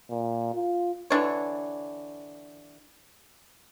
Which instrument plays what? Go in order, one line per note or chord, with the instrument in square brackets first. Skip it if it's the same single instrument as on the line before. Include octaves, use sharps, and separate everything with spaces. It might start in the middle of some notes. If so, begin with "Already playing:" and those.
[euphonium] A#2
F4
[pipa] D3 E3 D4 C#5